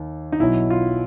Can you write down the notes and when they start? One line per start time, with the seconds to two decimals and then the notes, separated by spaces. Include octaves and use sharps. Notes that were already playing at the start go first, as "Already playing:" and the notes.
Already playing: D#2 D#3
0.32 D#4
0.40 B1 B2 F#3 E4
0.70 F4